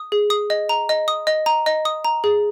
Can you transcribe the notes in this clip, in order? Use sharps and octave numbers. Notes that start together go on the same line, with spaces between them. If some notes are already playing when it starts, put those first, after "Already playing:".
Already playing: D#6
G#4
D#6
D#5
A#5
D#5
D#6
D#5
A#5
D#5
D#6
A#5
G#4